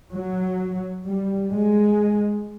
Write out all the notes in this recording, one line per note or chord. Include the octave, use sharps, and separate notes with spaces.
F#3
G3
G#3